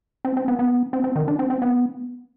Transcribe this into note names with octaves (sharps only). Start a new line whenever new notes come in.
C4
C4
B3
B3
C4
C4
D#3
D4
C4
C4
B3